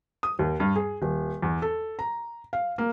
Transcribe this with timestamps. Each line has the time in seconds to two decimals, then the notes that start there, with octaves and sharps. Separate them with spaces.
0.23 D#6
0.39 D#2
0.60 G2
0.76 G#4
1.02 D#1
1.42 E2
1.62 A4
1.99 A#5
2.53 F5
2.78 A#3